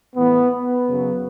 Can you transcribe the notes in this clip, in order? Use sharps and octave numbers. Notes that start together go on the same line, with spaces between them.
A2 E3 B3
B3
F#2 C#3 F#3